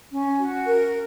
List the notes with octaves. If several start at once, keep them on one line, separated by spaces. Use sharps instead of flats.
C#4
F#4
A#4